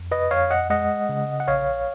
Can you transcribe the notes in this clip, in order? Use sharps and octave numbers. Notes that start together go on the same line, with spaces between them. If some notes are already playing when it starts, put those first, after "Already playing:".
Already playing: F2
B4 D#5
F2 C#5 F5
D#5 F#5
G#3 D#5 F#5
C#3
F#5
A#1 C#5 F5